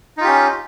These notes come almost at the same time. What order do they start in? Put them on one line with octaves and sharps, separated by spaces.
D#4 F4 G4 C#4